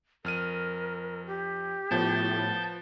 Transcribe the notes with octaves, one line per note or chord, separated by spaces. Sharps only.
F2 A#4 F6 D#7
G4
A2 F3 B3 A5 G6